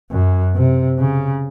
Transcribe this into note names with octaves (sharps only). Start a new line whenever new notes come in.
F#2
C3
C#3